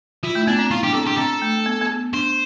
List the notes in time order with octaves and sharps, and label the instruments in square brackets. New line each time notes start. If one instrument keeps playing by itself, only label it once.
[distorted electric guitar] E4 [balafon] F4
[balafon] A3
[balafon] B3 [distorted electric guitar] D4
[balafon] C4
[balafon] E4 [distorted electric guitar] F4
[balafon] D4 [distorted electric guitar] G4
[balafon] C4 [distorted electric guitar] A4
[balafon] D4 [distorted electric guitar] G4
[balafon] C4 [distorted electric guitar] A4
[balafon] A3
B3
B3
[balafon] D4 [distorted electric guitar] C5